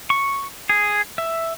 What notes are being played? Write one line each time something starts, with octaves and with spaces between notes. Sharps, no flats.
C#6
G#4
E5